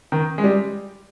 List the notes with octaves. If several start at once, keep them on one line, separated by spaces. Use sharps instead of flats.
D#3
G#3
G3